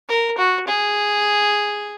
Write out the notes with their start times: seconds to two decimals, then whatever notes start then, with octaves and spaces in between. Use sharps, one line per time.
0.09 A#4
0.38 F#4
0.68 G#4